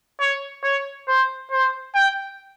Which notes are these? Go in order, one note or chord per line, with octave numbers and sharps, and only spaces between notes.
C#5
C#5
C5
C5
G5